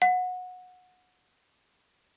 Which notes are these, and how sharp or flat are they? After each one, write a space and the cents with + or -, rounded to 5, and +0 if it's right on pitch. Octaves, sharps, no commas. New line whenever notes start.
F#5 -20